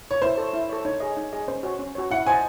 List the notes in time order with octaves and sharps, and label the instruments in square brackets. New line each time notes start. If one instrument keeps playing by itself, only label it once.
[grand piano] C#5
[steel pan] E4 [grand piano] C5
[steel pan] A4 C#5
E4
A4 C#5
[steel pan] D#4 [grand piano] C#5
[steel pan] G#4 D#5
D#4
G#4 D#5
[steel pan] C#4 [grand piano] C5
[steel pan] F#4 C#5
C#4
F#4 C#5
[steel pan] E4 [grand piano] F#5
[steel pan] C5 D#5 A5 [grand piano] G#5